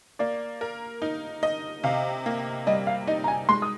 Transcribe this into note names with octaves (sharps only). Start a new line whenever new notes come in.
A#3 D5
A#4
D#4
D#5
C3 F5
A#3
G3 D#5
F5
D#4 D#5
A#5
G#5
G#3 C6
D#6